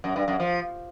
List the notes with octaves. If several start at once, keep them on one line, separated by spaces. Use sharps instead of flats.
F#2
G2
F#2
F3